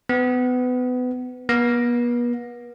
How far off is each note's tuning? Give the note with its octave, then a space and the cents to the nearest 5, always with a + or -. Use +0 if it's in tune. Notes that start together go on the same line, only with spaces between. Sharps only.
B3 +25
B3 -40